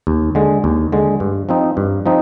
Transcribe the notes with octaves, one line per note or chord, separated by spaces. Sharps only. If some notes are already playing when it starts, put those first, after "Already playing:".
D#2
D3 G#3
D#2
D3 G#3
G2
F3 C4 D#4
G2
F3 C4 D#4